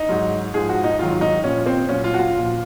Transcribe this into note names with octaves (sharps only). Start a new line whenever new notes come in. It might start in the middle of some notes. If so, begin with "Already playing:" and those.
Already playing: D#4
G#2 F#3
G#2 F3 G#4
F#4
D#4
G#2 D#3 F#3 F4
D#4
A#2 F3 C#4
C4
A#2 F#3 C#4
F4
F#4
F4
A#2 F3